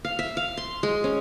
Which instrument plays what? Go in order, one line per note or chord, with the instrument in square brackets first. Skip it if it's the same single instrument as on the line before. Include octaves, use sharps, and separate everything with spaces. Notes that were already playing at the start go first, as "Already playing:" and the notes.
[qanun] F5
E5
F5
C6
G#3
C#4